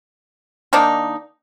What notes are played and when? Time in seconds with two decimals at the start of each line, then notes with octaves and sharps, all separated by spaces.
0.73 D#3 A#3 D4 D#4